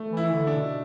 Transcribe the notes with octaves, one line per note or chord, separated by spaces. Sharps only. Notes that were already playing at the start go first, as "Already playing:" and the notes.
Already playing: A3
E3
E4
D3
D4
B2